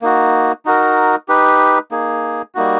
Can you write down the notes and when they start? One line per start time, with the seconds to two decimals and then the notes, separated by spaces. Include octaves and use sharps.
0.02 A#3 D#4 F#4
0.65 D#4 F#4 A#4
1.28 D#4 G4 B4
1.91 A#3 D#4 G#4
2.55 G3 A#3 D#4 F#4